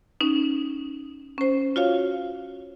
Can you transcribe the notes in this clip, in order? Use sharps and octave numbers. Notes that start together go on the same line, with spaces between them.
C#4 D#4
C#4 C5
F4 F#4 C#5 F5